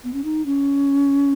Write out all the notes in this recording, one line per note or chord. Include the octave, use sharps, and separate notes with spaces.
B3
C#4
D#4
C#4